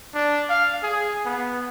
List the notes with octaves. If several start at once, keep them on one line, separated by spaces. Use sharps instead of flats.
D4
F5
G#4
B3